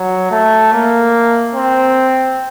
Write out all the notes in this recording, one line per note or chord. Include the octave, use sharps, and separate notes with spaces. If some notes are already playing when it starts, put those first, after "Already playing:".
Already playing: F#3
A3
A#3
C4